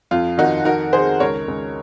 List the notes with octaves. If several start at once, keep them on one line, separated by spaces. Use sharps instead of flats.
F2 F4
D#3 D#4 F#4
D#3 F#4 A#4
D#3 G#4 C5
C#2 A#4 C#5
C#2